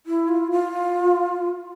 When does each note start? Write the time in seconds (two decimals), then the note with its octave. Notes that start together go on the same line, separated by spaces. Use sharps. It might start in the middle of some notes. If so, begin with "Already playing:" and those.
0.06 E4
0.28 F4
0.52 F4